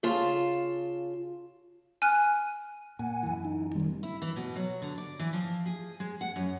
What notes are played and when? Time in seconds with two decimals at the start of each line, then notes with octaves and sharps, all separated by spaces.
0.03 C#3 F4 A5
2.02 G#5 F6 F#6 D#7
2.99 A#2 F#5 G#5
3.23 F#2 E3
3.45 D#4
3.75 F#1 E2 D#3 G3 C4
4.03 E4
4.22 E3
4.36 B2
4.56 F#3
4.82 D3
4.98 D5
5.19 E3
5.33 F3
5.66 G#4
6.00 G#3
6.21 F#5
6.36 F#2